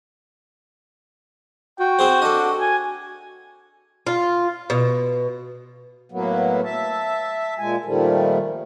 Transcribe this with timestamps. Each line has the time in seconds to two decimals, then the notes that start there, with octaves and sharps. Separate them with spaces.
1.80 F#4 G5
1.99 C4 G#4 C5
2.22 D4 A4 D#5
2.60 G#5
4.07 F4
4.70 B2
6.12 A2 F#3 A#3 B3
6.65 E5 A5
7.59 A#2 G#3 G#5
7.85 A#2 D#3 F3 G3 A3